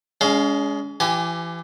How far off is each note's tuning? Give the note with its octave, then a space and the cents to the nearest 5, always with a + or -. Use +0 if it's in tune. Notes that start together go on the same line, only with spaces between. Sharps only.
G#3 +0 C#4 +40 F5 +0
E3 +35 G4 -10 G#5 +0